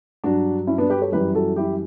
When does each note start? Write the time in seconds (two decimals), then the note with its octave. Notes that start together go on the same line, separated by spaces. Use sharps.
0.24 G2 F#3 D4 F#4
0.67 C#4 E4
0.78 B3 D4
0.90 G4 B4
1.01 A4 C#5
1.12 F#2 E3 G3 G4 B4
1.35 F#4 A4
1.56 E4 G4